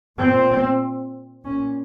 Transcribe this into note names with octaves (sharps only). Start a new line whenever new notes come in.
A#2 C4
A#2 C#4